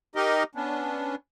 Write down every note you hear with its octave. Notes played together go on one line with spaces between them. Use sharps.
D#4 G4 A#4 D#5
B3 C#4 D4